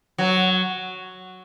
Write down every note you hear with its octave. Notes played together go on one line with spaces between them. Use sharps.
F#3